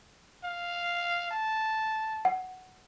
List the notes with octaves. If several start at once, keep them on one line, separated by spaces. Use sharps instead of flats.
F5
A5
F#5